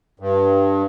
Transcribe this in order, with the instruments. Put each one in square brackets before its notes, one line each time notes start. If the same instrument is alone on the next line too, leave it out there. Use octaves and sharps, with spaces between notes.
[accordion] G2